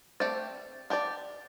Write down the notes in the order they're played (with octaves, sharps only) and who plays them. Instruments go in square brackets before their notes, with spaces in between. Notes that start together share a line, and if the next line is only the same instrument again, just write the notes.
[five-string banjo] A3 C4 G4 D5
D4 G4 D5